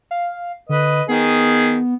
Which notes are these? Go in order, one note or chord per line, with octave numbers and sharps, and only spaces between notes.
F5
D3 B4 D#5
D#3 B3 G#4